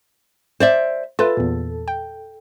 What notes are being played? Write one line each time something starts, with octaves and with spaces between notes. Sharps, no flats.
C5 D5 E5
F4 A4 B4 E5
E2 A#2
G5